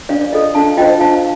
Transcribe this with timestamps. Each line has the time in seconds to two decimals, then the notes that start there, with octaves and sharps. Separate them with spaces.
0.09 D4 D5 F5
0.21 D5
0.32 F4 A4 D#5
0.55 D4 F5 A5
0.77 F4 C5 D#5 G5
1.00 D4 F5 A5